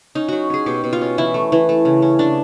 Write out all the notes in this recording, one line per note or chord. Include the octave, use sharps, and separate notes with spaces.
C#4 D#4
F#3 F#4
C#4 G#4
B2 G4
B2
F4
C#4
E3 E4
A3
E3
A3
C#3
C#4
C#3 D4